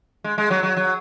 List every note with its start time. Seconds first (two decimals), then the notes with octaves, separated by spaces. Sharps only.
0.24 G#3
0.38 G#3
0.51 F#3
0.63 F#3
0.77 F#3